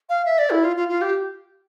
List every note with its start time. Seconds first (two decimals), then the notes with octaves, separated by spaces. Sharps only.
0.09 F5
0.25 E5
0.39 D5
0.51 E4
0.64 F4
0.76 F4
0.89 F4
1.02 G4